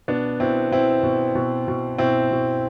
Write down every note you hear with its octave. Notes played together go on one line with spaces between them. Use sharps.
B2 B3 D4
B2 C4 E4
B2 C4 E4
B2
B2
B2
B2 C4 E4
B2